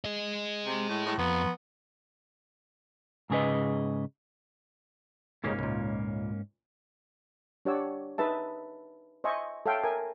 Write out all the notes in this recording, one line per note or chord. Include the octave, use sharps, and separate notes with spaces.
G#4 D#5
C3
A2
A2
F2 B3
G#2 C#3 G#4 B4 D#5
G1 G#2 C#3 A#3 C#4 D#4
C#2 A#2
D4 G4 C#5 D5 F#5 E6
D#4 G#4 B4 E5 A5
C5 D#5 E5 G#5 C#6
A4 C#5 E5 F5 G5
A#4 E5 G#5